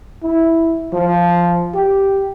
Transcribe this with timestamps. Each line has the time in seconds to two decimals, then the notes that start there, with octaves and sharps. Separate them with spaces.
0.23 E4
0.93 F3
1.74 G4